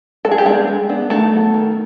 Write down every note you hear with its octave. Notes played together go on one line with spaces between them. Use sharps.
G#3 A4
G#4
G4
G#3 B3 D4 G#4
G#3
B3 D4
D#3 A3 A4
F#3 B3
D#3